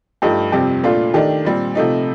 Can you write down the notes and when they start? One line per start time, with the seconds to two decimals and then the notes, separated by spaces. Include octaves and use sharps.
0.22 G2 F3 A3 D#4 G4
0.52 F2 C3 G3 C4 G4
0.83 A#2 A3 D4 F4
1.14 D#3 A3 D4 G4
1.45 A#2 G3 C4
1.75 C3 F3 A3 D#4